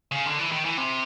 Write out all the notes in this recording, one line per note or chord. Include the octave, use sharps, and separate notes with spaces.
C#3
D3
E3
D#3
E3
C3